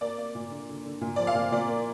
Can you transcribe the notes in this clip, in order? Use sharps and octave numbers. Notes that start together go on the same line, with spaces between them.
A#3 D5
A#3
A#2
D3
D3
D3
A#2
F3 D5
F5
A#2
A#2 D5
A#3